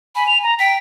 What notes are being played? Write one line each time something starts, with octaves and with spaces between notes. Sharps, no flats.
G#5 B5
F7
A#5
G5 B6